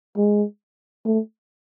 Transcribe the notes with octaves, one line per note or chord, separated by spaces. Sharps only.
G#3
A3